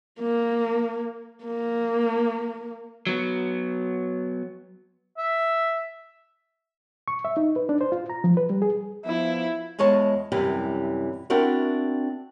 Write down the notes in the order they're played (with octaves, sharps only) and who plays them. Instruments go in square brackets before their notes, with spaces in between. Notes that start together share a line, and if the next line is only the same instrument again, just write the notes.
[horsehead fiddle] A#3
A#3
[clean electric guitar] F#3 B3
[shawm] E5
[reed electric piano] C#6
E5
D#4
B4
D4
C5
F4
A#5
F3
B4
G3
G#4
[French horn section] F3 B3 [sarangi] E4
[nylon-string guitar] E2 G#3 C#5 D#5 A5
F#2 C3 E3 G3
C4 D4 E4 F#4 A#4